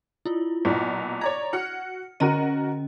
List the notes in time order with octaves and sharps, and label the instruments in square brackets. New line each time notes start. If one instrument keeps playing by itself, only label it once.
[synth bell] E4 F4
[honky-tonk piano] B1 A#2
[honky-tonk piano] C#5 D5 A#5 [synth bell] G#6
[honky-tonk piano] F#4 F#5 F6 [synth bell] C#7
[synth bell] D3 C#4 D#5 [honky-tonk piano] F#4 A#4 D#7